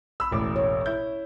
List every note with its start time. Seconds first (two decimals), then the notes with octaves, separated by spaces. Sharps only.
0.20 B5 E6
0.31 E1 A1 D6
0.56 C#5
0.86 E4 G6